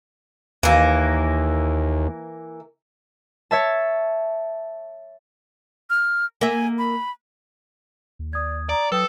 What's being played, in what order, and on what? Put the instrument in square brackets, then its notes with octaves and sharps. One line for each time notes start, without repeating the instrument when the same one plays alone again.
[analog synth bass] D#2 [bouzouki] E3 A#3
[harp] C#5 E5 A5
[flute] F6
[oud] A#3 E5 [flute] G#5
[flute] B5
[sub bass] D#2
[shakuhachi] D5 [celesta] D#6 G#6
[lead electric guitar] D5 [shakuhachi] A#5
[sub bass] F#3 [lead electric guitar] A4 [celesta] B4 D#6 [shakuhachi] G5